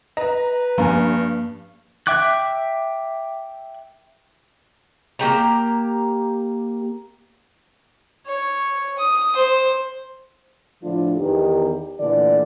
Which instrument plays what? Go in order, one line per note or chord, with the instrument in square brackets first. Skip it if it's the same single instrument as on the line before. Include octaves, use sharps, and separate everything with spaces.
[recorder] B4 [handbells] D#5 [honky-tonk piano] A#5
[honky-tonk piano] G2 [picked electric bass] F3 A#3 C#4 [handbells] G#5 A#5
[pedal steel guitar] E5 G5 D6 F#6
[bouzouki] A#3 F#4 G4 A#5
[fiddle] C#5
D#6
C5
[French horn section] A2 D3 F3 A3 D4 F4
E2 D#3 B3 D#4 G4
A#2 D3 E3 A3 D5